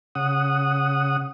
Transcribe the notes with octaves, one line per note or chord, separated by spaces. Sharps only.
C#3 F#5 D#6